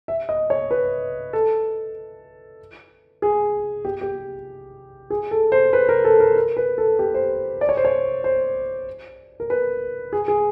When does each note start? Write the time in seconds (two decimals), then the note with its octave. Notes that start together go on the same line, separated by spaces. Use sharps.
0.08 E5
0.29 D#5
0.50 C#5
0.71 B4
1.33 A4
3.22 G#4
3.85 G4
4.01 G4
5.10 G#4
5.31 A4
5.52 C5
5.73 B4
5.89 A#4
6.05 A4
6.20 A#4
6.36 A#4
6.57 B4
6.78 A4
6.99 G4
7.14 C5
7.61 D5
7.69 C#5
7.77 C5
7.85 C#5
8.24 C5
9.40 A#4
9.50 B4
10.13 G#4
10.28 G#4